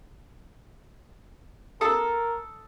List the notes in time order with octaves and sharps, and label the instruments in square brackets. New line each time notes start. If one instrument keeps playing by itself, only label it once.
[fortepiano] A4 D#6 [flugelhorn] A#4